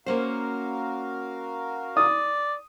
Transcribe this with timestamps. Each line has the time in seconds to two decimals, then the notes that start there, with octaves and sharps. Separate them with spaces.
0.06 A#3 C#4 F#4 A#4 C5 F5
1.97 D5 D#6